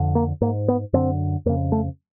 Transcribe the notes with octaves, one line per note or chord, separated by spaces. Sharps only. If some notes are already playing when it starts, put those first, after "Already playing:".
Already playing: F2 D3
A#3
G#2 A#3
B3
F#2 D3 C4
F2 C#3 A#3
A3